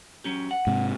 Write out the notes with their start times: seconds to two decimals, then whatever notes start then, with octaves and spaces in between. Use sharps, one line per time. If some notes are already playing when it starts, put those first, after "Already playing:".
0.24 F#3 C#4 G4
0.51 F#5
0.67 G#2 C3